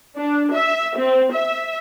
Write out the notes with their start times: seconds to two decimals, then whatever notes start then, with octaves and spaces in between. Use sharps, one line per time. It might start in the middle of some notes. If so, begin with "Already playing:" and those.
0.16 D4
0.53 E5
0.97 C4
1.33 E5